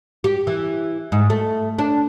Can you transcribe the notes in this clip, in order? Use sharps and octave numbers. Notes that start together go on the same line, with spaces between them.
G4
E3
G#2
A3
D4